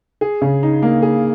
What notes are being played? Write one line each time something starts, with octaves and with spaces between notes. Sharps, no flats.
G#4
C#3
D#4
A#3
G#4